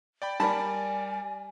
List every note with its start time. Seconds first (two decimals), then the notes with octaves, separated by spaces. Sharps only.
0.22 D5 G5 B5
0.40 G3 A#4 D5 G#5 A5 B5